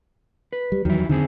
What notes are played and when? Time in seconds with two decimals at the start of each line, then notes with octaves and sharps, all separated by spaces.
0.53 B4
0.72 G3
0.85 E2 D#3 F#3 E4
1.09 D3 D#3 C4 G#4